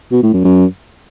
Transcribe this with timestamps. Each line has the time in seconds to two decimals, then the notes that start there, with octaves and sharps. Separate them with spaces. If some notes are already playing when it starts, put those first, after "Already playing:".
0.12 B2
0.23 A2
0.34 F#2
0.45 F#2